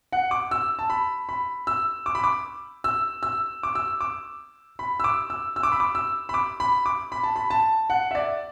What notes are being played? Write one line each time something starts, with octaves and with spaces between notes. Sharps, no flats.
F#5
D6
E6
A5
B5
B5
E6
D6
B5
D6
E6
E6
D6
E6
D6
B5
E6
D6
E6
E6
D6
B5
D6
E6
B5
D6
B5
D6
B5
A5
B5
A5
F#5
E5
D5